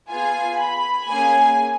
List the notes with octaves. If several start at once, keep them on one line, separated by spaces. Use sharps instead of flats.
B3 F4 G#4 G#5
B5
A#3 C#4 G#4 G#5